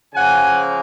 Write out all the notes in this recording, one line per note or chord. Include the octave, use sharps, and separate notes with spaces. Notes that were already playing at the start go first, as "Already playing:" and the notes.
C#3 F3 A#3 F#5 G#5